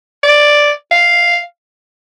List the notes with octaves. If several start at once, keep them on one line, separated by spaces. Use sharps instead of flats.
D5
F5